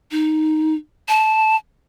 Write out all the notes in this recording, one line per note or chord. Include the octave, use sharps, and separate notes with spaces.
D#4
A5